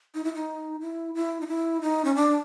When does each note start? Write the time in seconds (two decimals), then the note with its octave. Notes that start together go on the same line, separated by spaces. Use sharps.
0.15 D#4
0.24 E4
0.34 D#4
0.81 E4
1.15 E4
1.41 D#4
1.48 E4
1.82 D#4
2.05 C#4
2.15 D4